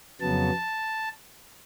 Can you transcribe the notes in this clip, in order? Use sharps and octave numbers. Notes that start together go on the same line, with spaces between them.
F2 C#3 F#3 B3 A5